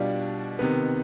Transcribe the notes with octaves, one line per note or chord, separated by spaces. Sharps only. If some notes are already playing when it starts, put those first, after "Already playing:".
Already playing: B2 G3 D4 F4
C3 D#3 B3